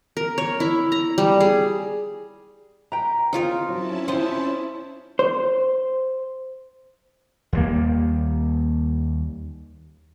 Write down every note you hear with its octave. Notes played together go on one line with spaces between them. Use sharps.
A#4
C#5
E4
A#5
G3
G#4
B4 G5 A#5
C4 C#4 D#4 F4 A#4
F#3 C#4 E4 A5
C4 C5 D#5
C5
D#2 G3 A#3